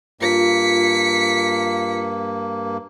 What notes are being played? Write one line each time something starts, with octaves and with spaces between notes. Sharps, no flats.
G2 A#3 F4 B6 C#7